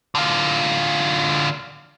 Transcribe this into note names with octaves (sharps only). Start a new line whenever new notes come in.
D3 F4